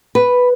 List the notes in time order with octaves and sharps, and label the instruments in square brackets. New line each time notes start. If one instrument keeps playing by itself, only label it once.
[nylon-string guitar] B4